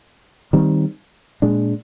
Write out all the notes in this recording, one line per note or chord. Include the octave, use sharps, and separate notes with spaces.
D#3 G3 C4
A#2 G#3 D4